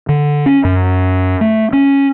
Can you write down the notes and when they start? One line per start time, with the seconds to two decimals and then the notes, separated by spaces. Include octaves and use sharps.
0.09 D3
0.46 C#4
0.65 F#2
1.41 A3
1.73 C#4